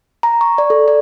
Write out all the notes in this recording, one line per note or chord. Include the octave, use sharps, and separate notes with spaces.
A#5
C#6
D5
A4
D5